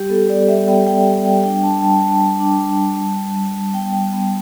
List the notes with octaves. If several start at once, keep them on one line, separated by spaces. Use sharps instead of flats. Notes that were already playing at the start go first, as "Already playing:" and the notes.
Already playing: G3 G4
B3 A4
G3 D5
G3 E5
B3 G5
G3 G5
G3 G5
G3 G5
D4 G5
D4 A5
G3 A5
D4 A5
G3
D4
G3
G3
G3
G3
G3
G3
B3 G5
G3
B3